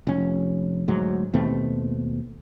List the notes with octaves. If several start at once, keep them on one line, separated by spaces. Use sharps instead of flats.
F1 C#4
D2 G#2 F#3
D#2 B2 A3 C4